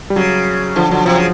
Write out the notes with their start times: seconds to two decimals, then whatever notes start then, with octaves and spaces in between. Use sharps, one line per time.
0.10 G3
0.16 C#3 F#3
0.76 D3 F3
0.91 D3 F#3
1.05 C3 F3
1.16 C#3